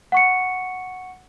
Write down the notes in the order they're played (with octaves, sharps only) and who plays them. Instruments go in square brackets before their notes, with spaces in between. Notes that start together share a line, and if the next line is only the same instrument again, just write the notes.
[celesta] F#5 C#6 C#7